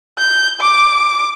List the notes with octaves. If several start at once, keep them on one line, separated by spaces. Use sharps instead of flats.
G6
D6